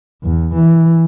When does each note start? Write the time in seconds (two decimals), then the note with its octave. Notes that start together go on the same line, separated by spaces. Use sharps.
0.24 E2
0.54 E3